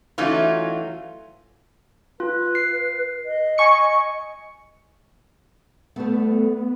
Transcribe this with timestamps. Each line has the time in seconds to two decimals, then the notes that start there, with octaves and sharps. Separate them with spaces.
0.18 E3 F#3 A3 C#4 D#4 F4
2.20 F4 B4
2.55 C7
3.25 D#5
3.58 G#5 C#6 C#7
5.96 G3 A3 B3